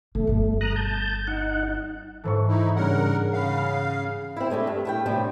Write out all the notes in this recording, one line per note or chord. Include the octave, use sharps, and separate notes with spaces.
B2 D#3 A3
G1 G3
A#5 D#6 F#6
A5 G6
D#4 F#5
G#2 E3 A4 C5 C#6
D#4 E4
G2 C#3 A#4 F#5
C#3 F5 F#5 B5
F6
C4 E4
G#3 A3 D4 A4
G2
A3 E4 G5
A2 C3 G3 A3 D4